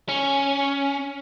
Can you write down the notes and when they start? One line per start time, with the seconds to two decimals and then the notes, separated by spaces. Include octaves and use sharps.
0.09 C#4